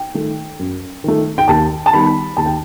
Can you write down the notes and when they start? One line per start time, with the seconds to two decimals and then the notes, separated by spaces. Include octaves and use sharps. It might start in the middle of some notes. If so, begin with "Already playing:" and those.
Already playing: G5
0.14 D#3 A3
0.59 F#2
1.04 D#3 A3
1.38 G5
1.48 D#2 A5
1.86 A5
1.93 D#3 G3 B3 B5
2.37 D#2 A5
2.46 G5